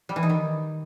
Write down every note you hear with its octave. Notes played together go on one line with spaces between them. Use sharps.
G3
E3
D#4
D#3